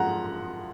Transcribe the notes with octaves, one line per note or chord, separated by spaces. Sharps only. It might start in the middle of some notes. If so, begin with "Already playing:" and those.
Already playing: F#2 F3 G#3 F#5 A#5